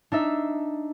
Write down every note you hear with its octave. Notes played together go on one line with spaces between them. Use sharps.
D4 D#4 E5